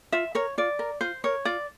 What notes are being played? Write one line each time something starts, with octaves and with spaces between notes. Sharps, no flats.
F4 E5
A#4 C#5
F4 D5
A#4
F4 C5
A#4 C#5
F4 D5